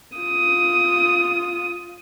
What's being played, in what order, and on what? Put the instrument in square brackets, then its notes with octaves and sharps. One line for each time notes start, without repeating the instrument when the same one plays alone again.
[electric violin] F4 D#6